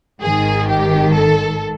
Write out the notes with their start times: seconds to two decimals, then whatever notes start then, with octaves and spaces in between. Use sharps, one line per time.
0.21 G#1 G#2 D#3 G#4
0.68 G4
1.14 A4